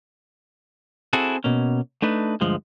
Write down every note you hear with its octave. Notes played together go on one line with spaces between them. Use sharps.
C4 E4 F#4 G#4 A4
B2 A#3 C#4
A3 D4 D#4 B4
D2 G2 F3 G#3